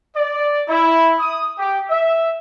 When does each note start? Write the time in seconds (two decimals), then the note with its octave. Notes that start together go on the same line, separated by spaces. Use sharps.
0.16 D5
0.69 E4
1.19 D#6
1.59 G4
1.90 E5